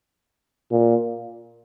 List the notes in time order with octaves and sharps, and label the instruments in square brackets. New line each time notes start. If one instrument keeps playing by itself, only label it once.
[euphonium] A#2